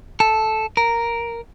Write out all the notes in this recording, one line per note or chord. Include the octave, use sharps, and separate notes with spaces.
A4
A#4